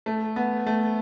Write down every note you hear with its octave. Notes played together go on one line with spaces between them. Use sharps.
A3
B3
A3